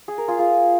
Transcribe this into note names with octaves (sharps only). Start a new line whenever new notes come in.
G#4
A#4
F4 G#4
F4 G#4